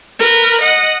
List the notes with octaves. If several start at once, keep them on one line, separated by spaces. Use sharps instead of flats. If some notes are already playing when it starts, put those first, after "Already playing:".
A#4 B4
D#5 F#5